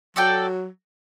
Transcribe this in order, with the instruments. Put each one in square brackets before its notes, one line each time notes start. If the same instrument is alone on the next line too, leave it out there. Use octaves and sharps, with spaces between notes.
[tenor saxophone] F#3 [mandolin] F#4 A4 D5 G5